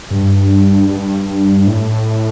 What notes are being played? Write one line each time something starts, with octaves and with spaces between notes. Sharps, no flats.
G2
G2
A2